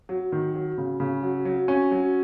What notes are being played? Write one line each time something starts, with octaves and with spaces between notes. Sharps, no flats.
F#3
D#3
F#3
C#3
C#3
F#3
F#3
C#4
F#3